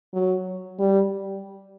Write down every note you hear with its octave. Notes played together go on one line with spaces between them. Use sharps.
F#3
G3